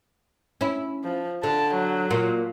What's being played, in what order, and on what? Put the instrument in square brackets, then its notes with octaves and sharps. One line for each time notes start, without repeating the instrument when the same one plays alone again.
[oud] C#4 E4
[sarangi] F3
[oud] D3 [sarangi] A5
[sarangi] F#3
[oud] A#2